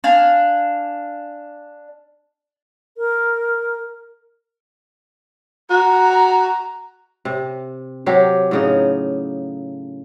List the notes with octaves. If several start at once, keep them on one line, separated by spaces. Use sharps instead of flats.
D4 F5 G#5
A#4
F#4 A#5
C3
C3 F#3 G4
A2 C#3 D#4